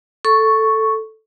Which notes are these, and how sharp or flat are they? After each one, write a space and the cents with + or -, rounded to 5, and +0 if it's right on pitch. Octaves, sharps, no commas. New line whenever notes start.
A4 +0 C#6 +0